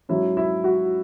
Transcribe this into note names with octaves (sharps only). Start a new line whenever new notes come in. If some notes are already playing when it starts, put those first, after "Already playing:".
G#2 F#3 C#4 E4 E5
E4 E5
F#4 F#5